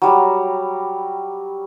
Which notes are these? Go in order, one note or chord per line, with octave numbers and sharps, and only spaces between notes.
F#3 G3